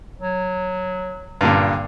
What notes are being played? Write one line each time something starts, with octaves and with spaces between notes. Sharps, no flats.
F#3
G2 A#2 D3